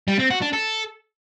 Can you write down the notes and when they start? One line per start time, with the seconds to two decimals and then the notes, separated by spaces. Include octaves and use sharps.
0.08 G3
0.19 C4
0.30 F#4
0.42 D4
0.53 A4